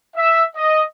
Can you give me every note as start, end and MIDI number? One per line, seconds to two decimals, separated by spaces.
0.16 0.45 76
0.56 0.83 75